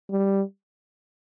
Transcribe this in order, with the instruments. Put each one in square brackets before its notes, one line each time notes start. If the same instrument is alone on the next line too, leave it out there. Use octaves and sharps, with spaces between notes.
[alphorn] G3